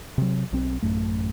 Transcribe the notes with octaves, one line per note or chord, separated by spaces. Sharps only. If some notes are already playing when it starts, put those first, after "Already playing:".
C3 F#3
B1 C4
A1 F#2 A3